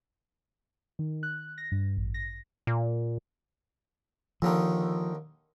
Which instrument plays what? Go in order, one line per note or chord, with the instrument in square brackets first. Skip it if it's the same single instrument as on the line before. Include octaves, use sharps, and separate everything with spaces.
[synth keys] D#3
F#6
A#6
G2
A1
A#6
[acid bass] A#2
[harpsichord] D#2 D3 D#3 [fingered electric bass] F3